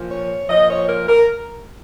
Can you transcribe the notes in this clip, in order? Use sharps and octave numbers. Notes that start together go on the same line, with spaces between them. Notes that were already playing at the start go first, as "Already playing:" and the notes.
Already playing: A#2 F3
C#5
A#2 F3 D#5
C#5
A#4
A#4